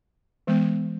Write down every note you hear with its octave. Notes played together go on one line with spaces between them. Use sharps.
E3 G#3 B3